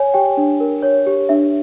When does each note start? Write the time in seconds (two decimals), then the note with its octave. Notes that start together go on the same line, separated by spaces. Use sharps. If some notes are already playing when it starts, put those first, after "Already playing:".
Already playing: C#5 G#5
0.14 G4 G5
0.37 D4
0.60 A#4
0.83 C#5
1.07 G4
1.29 D4 E5